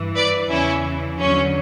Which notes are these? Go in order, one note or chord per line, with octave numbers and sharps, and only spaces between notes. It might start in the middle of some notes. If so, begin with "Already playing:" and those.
Already playing: G2 E3
B4 D5
E2 C#3 E3 C#4 E4
E2 D3 F#3 C#4